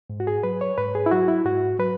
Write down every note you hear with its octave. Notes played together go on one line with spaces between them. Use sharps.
G#2
F#4
G#4
F#3 B4
C#5
G#2 B4
G#4
E4
F#3 F#4
E4
G#2 F#4
F#3 B4